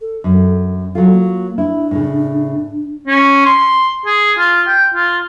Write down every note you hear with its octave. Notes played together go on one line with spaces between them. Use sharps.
A4
F#2
F#3 F4 A4
A#3
D4 E4
A2 C#3
C#4
C6
G#4
F4
G5
F4